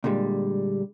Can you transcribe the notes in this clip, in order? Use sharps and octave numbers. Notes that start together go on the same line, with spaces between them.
A#2 D3 G3 G#3